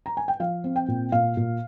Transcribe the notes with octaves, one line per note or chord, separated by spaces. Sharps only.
A#5
G#5
G5
F3 F5
C4
G5
A#2
A#2 F5
A#2